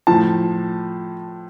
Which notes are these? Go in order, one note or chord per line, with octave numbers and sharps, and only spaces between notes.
A2 F3 A5